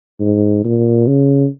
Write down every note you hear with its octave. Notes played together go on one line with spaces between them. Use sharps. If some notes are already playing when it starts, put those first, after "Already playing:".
G#2
A#2
C#3